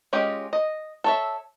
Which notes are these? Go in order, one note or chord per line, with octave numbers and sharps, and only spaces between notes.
G#3 C#4 F4 G4 D#5
D#5
A4 C#5 E5